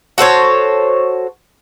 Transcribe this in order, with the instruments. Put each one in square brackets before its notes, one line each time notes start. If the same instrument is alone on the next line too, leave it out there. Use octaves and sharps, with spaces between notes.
[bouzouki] F#4 A4 C5 C#5